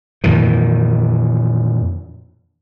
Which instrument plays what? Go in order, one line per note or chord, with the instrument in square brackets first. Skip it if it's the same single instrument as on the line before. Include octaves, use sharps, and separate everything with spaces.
[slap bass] F2 A#2 D#3 E3